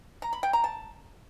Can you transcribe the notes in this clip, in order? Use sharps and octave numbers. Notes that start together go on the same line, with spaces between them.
A#5
B5
G5
A#5
A5